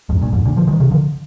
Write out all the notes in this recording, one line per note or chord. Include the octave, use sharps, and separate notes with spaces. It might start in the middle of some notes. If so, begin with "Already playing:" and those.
F2 G#2
G2 A#2
F2 G#2
A#2 D3
D3 F3
D#3 G3
C3 D#3
D3 F3